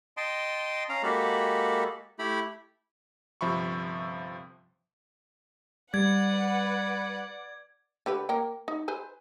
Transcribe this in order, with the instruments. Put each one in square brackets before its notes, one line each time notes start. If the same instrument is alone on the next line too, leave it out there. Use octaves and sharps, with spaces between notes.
[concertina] D#5 G5 A5 C6
C#4 F5 A#5
G#3 A#3 F#4 G4 A4 B5
A3 E4 G4 B5
[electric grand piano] G1 C3 F3 E5 B5 C#6
[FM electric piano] G3 [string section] B4 F#5 [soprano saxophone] D5 [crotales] G#6
[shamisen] D3 G4 B4
A#3 A#4 G5
D#4
B4 C5 G#5